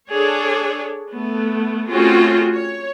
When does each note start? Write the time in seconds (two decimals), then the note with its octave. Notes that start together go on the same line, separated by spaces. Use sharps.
0.11 D4 G#4 A4 C#5 D5
1.14 A3 B3
1.89 A3 C4 C#4 F4 F#4 G#4
2.55 C#5